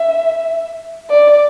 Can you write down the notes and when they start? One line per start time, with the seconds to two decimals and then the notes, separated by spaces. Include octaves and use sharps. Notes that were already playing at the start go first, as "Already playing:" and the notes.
Already playing: E5
1.10 D5